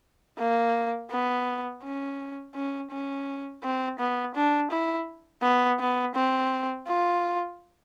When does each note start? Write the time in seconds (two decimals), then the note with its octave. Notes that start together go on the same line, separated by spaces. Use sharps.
0.39 A#3
1.11 B3
1.83 C#4
2.55 C#4
2.91 C#4
3.63 C4
3.99 B3
4.35 D4
4.71 E4
5.42 B3
5.79 B3
6.15 C4
6.87 F4